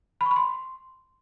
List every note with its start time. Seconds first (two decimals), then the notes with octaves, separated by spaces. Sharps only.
0.21 B5
0.26 C#6
0.31 B5
0.36 C6